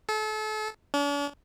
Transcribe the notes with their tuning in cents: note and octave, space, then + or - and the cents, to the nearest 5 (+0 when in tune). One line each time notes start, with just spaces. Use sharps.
A4 -35
D4 -45